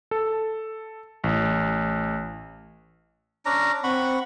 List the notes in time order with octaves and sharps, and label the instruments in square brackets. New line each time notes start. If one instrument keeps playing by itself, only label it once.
[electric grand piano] A4
A1
[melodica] C#4 D4 A#5
[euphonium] C4 [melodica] F#5 B5 C#6